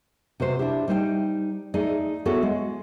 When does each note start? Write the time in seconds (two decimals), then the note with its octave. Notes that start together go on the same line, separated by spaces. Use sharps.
0.40 C3 F#4 B4 C5
0.59 D4 E4 G4
0.88 G3 D#4 C5 E5 G5
1.74 A3 D#4 G#4 D5
2.26 B3 E4 F#4 G#4 A4 C#5
2.43 G#3